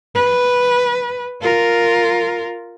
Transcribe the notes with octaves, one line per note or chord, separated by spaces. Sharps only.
B4
F4 A#4